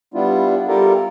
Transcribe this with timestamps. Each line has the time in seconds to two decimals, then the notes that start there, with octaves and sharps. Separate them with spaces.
0.14 G3 B3 D4 E4 F4
0.68 G3 E4 F4 G4 A4 A#4